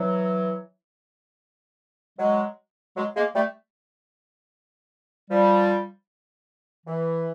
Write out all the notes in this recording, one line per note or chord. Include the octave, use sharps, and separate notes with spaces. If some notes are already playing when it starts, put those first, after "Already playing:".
Already playing: E3 F#3
F#3 G#3
F#3 G#3
G#3 A#3
G3 A3
F3 G3
E3